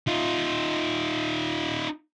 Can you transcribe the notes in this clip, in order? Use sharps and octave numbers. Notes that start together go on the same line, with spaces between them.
D#4 F4